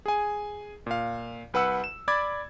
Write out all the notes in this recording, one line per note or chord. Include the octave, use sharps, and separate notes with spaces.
G#4 G#5
A#2 F5
C2 B4 F#5 E6 C#7
E7
D5 B5 D6 G#6 A6